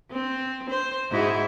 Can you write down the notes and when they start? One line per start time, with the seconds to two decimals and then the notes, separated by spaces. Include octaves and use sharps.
0.11 C4
0.71 C5
1.11 G#2 E4 F#4